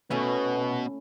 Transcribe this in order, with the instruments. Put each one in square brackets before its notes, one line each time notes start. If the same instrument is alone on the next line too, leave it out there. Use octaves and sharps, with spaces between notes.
[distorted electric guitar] B2 [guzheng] A3 C#4 E4 [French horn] B3